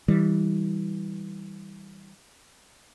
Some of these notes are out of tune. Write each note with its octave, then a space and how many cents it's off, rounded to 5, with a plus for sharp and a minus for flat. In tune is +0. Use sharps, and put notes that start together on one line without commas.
E3 -25 G3 +0